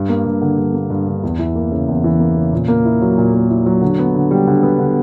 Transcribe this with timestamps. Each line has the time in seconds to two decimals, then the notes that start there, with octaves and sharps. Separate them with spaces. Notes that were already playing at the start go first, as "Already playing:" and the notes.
Already playing: G2
0.09 A#3
0.26 G2
0.41 D3
0.58 G2
0.74 A#3
0.90 G2
1.07 D3
1.23 E2
1.39 E3
1.56 A#3
1.72 C#3
1.88 E2
2.04 E3
2.20 A#3
2.37 C#3
2.53 A#2
2.68 A#3
2.85 E4
3.02 F#3
3.18 A#2
3.34 A#3
3.49 E4
3.66 F#3
3.82 D3
3.99 B3
4.14 D3
4.31 G3
4.47 D3
4.63 B3
4.79 D3